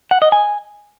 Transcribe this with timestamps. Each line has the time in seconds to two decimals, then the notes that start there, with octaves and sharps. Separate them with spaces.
0.11 F#5
0.22 D#5
0.32 G#5